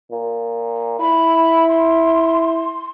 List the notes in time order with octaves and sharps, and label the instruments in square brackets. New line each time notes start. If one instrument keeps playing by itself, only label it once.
[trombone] A#2
[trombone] E4 [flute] B5
[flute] C6